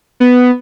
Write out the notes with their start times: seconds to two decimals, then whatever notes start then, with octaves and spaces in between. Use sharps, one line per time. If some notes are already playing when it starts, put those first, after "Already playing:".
0.20 B3